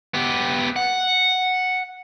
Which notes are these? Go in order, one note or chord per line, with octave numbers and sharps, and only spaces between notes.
B3 G4
F#5